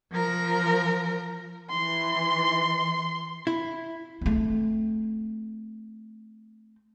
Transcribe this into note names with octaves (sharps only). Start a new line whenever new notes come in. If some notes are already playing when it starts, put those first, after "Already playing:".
F3 A#4
E3 C6
E4
A3 C4